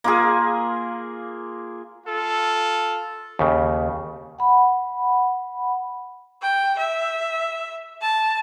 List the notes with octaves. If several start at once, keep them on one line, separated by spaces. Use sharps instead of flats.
A#3 F4 G#4
F4 A4
D#2 C#3
F#5 B5
G5
E5
A5